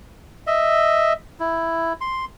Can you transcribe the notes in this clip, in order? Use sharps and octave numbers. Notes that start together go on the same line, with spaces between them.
D#5 E5
E4
C6